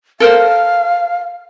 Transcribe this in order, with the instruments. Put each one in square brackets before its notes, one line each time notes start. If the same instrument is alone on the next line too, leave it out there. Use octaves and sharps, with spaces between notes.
[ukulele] A4 A#4 C5 [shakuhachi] F5